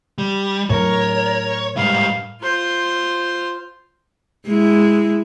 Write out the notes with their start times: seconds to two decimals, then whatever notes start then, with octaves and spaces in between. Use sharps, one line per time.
0.18 G3
0.70 A2 F#3 A#4 C#5
1.77 G#2 G3 F5
2.42 F4 C5
4.46 G#3 E4